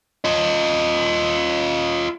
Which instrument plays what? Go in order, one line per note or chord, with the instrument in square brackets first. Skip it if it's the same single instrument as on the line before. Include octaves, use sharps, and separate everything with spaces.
[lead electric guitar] F4 D#5